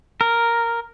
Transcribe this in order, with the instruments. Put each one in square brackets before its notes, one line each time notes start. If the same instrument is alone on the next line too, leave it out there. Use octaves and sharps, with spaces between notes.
[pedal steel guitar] A#4